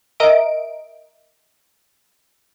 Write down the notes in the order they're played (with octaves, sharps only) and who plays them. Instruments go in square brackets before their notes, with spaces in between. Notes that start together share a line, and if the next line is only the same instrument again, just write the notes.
[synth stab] A#4 D#5 E5 D7